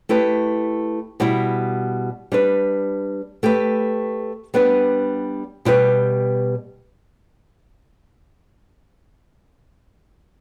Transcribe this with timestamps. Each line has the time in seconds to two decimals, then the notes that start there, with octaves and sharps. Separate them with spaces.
0.09 A3 E4 G4 B4
1.20 B2 G3 E4
2.32 G3 D4 B4
3.43 A3 G4 B4
4.54 G3 B3 D4 B4
5.65 B2 G3 E4 G4 B4